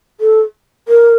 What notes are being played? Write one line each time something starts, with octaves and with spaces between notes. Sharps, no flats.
A4
A#4